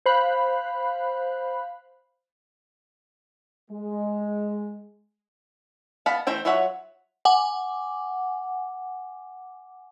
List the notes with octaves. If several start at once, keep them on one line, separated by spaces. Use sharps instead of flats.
C5 F5 B5 F#6
G#3
B3 F5 F#5 A5 B5
E3 A3 C5 G5 A#5
F#3 F4 C#5 E5 F#5
F#5 G#5 D6